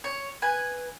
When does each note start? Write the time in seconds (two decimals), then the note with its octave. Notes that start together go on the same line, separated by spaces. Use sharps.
0.04 C#5
0.42 B4 G#5